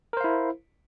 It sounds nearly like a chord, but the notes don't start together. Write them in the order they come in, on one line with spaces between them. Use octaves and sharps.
A#4 C5 F5 E4